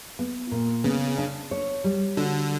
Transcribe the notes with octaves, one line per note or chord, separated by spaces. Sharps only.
B3
A#2
C#3 B3
D4
C#5
G3
D3 F#4